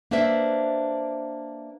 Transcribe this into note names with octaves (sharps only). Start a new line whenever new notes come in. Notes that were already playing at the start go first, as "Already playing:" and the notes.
A#3 D4 B4 C5 E5